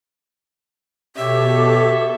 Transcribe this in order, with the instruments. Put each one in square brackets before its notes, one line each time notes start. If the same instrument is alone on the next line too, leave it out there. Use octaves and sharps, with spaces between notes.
[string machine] B2 A4 [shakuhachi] G4 [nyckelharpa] C#5 E5